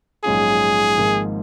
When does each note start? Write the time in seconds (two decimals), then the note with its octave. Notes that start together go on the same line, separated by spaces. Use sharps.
0.24 A#1 G#2 F#3 C#4 F4 G#4
0.97 G#1 G#2 F3 A#3